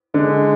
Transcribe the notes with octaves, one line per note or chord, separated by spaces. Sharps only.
D3 G#3